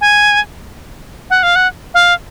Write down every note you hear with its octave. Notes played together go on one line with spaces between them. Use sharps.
G#5
F#5
F5
F#5
F5